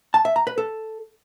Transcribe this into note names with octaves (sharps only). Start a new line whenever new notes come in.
A5
E5
A#5
B4
A4